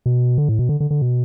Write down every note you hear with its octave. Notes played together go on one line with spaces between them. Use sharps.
B2
D3
A2
B2
D3
D3
D3
B2